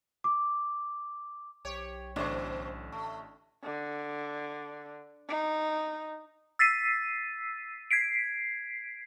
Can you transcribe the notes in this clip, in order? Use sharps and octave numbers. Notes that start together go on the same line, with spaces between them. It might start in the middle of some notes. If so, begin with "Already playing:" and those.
D6
B1 G4 C#5
A1 B2 D3 D4 C5 C#6
A3
D3
D#4
E6 A6 B6 C7 D#7
G#6 B6 C7 D7